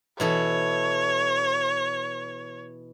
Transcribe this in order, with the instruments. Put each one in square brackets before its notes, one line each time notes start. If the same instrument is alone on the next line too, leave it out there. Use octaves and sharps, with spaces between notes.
[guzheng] B2 E3 A4 [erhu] C#5